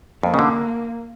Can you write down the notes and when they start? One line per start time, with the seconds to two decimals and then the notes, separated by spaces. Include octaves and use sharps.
0.23 F2 A#3
0.34 C#3
0.39 D3